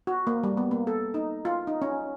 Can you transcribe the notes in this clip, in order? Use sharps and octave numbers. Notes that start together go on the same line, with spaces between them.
F#4
A#3
G3
B3
A#3
A4
D#4
F4
D#4
C#4